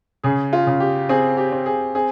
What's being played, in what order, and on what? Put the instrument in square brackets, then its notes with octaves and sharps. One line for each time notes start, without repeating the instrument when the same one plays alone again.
[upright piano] C#3 [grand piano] G#4
[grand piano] F4
[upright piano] C#3
[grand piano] G4
[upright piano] C4 [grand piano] G#4
[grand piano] G4
[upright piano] C4
[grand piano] G#4
[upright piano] C4 [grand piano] G#4